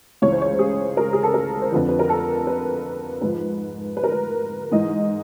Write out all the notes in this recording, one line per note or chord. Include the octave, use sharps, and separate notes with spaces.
C#2 C#3 E3 C#5
C5
C#5
G#4
A#4
G#4
A4
A#4
C5
F2 D3 F3 B4
B4
A#4
A4
B4
G#2 F3 B4
B4
A#4
B4
G#2 E3 D#5